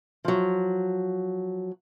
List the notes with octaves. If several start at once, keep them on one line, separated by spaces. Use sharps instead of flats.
F3 F#3